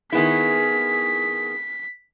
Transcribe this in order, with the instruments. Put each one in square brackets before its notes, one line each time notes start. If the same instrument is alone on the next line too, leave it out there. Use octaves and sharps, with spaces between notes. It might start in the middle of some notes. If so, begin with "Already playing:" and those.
[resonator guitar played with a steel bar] D#3 B3 E4 [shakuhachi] G#4 [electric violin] B6